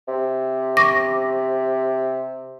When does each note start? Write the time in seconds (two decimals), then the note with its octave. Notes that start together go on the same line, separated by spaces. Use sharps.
0.08 C3
0.77 C#6 D6 A#6